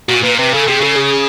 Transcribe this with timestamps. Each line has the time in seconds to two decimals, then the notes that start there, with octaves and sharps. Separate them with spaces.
0.08 A#2 F#4
0.23 A#2 B4
0.39 C3 B4
0.54 C#3 A4
0.68 C3 G#4
0.81 C#3 A4
0.96 G#4